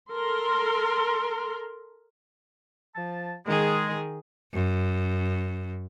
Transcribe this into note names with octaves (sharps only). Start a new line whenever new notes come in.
A4 A#4 C6
F3 A5
D#3 G#3 G#4
F#2